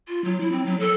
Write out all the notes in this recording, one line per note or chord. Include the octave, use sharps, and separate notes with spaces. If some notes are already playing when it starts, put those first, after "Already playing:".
F4
F#3
E4
C4
F#3
A4